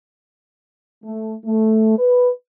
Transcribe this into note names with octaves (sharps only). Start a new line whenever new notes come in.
A3
A3
B4